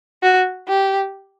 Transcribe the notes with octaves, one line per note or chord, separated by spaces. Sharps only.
F#4
G4